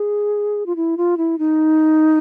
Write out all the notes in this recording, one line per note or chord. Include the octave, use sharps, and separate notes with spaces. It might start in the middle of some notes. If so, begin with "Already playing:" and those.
Already playing: G#4
F4
E4
F4
E4
D#4